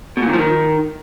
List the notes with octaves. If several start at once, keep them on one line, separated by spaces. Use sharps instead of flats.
B2
A#2
D#3
F3
D#3